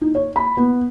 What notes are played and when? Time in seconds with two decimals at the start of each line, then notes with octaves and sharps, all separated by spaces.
0.01 D#4
0.15 C#5
0.36 B5
0.57 B3